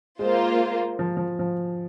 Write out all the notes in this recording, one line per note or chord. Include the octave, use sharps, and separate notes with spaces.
G#3 A#3 F4 C5
F3
F3
F3